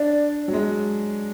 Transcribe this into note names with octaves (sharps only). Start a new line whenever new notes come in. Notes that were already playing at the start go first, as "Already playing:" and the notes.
Already playing: D4 D5
F#3
G#3